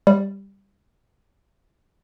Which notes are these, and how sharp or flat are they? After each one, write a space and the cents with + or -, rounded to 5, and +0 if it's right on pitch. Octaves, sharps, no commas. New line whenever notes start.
G3 +5